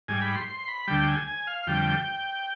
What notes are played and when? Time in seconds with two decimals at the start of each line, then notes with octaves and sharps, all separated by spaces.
0.08 G#2 G3 G#5
0.22 B5
0.35 C6
0.48 C6
0.68 B5
0.88 D2 D3 G3 G5
1.08 G#5
1.27 G#5
1.47 F5
1.67 F2 D3 G3 G5